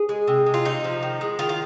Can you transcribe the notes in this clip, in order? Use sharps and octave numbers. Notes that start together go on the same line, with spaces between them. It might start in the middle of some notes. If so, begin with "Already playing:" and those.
Already playing: G#4
G#3
C3
G#3
F4
C3 D#4
F3
D#3
G#3
D#3 F4
F4